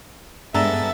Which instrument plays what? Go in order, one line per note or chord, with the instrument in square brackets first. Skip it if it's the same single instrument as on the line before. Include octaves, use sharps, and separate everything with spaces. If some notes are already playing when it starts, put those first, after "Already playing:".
[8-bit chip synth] G2 B3 A6 [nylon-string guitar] G#3 D4 [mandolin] A4 A#5 [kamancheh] E5